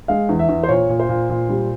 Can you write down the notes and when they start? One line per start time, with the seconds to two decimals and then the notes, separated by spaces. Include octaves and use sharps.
0.08 G#3 F5
0.29 E2
0.39 E5
0.49 E2
0.63 C5
0.69 A#2 C#5
0.89 A#2
1.00 C5
1.09 A#2
1.30 A#2
1.49 G3